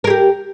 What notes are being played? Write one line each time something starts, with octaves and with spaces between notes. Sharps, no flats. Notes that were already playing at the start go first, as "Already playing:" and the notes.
G4 G#4 A#4